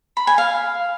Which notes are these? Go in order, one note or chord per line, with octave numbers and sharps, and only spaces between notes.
B5
G#5
F5